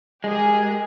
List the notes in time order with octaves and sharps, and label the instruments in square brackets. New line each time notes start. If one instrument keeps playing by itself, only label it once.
[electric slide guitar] G#3 [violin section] G4 G#4 A#4